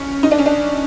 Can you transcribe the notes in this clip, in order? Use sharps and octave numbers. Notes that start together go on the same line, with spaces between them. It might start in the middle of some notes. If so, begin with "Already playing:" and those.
Already playing: C#4
D#4
D4
C#4
D4